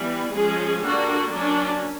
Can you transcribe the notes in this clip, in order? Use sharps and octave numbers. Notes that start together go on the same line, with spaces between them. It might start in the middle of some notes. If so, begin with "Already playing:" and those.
Already playing: E3 G3 B3
F3 G#3 C#4 G#4
D3 G3 A#3 D4 F#4
F#3 A#3 C#4 D4